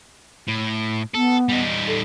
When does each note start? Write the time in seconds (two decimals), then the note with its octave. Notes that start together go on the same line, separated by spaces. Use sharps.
0.48 A2
1.15 B3 A4
1.49 G3 D#4
1.87 A4